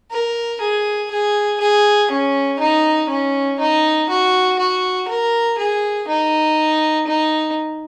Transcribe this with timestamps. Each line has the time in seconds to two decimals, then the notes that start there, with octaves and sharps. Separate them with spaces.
0.11 A#4
0.61 G#4
1.11 G#4
1.60 G#4
2.10 C#4
2.60 D#4
3.10 C#4
3.59 D#4
4.10 F#4
4.59 F#4
5.08 A#4
5.59 G#4
6.08 D#4
7.07 D#4